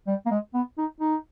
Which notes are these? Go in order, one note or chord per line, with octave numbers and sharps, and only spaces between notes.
G3
A#3
G#3
B3
D#4
D#4